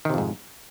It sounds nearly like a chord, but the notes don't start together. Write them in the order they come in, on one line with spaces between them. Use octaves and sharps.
D#3 C3 F2 G#2